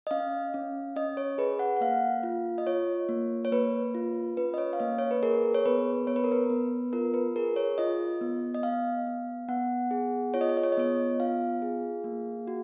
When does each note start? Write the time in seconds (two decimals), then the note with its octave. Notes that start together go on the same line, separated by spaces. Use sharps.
0.07 D#5
0.11 C#4 F5
0.54 C#4
0.96 C#4 D#5
1.17 C#5
1.38 G#4 B4
1.59 F#5
1.77 F#5
1.81 A#3 F5
2.23 F4
2.58 D#5
2.67 F4 C#5
3.09 A#3
3.45 C#5
3.51 A#3 B4
3.95 F4
4.37 C#4 B4
4.54 D#5
4.58 C#5
4.73 F5
4.80 A#3 D#5
4.99 C#5
5.11 B4
5.23 G#4 A#4
5.54 C#5
5.66 B3 B4
6.07 B3 C#5
6.16 B4
6.24 A#4
6.32 B4
6.50 B3
6.93 F4 A#4
7.14 B4
7.36 G#4 A#4
7.56 C#5
7.78 F4 D#5
8.21 B3
8.55 D#5
8.63 B3 F5
9.07 B3
9.49 B3 F#5
9.91 G#4
10.34 F4 C#5
10.41 D#5
10.49 C#5
10.57 D#5
10.63 C#5
10.72 D#5
10.77 B3 C#5
11.20 F4 F5
11.62 G#4
12.04 A#3
12.47 F#4